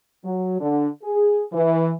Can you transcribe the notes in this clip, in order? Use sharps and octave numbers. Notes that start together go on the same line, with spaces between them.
F#3
D3
G#4
E3